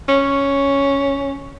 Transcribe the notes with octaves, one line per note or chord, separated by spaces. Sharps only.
C#4